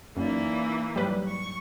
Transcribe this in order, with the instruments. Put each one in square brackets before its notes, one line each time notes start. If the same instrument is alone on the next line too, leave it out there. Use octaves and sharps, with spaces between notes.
[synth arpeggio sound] F#2 [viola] E3 A#3 [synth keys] C#4 D#4 D5
[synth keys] G#2 F#3 [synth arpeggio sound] G3 B4
[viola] C#6